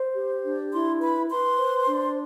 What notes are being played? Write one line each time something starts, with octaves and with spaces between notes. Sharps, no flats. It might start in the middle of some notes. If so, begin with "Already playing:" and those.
Already playing: C5
G4
D4
E4 C6
B4 B5
B4 C6
C5
D4